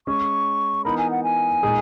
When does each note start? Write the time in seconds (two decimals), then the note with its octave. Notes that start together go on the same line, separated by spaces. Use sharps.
0.07 G#3 C#4 G#4 C#6
0.85 E3 B3 D#4 A#4 B5
0.98 G#5
1.11 F#5
1.24 G#5
1.63 A#2 G#3 D#4 G#4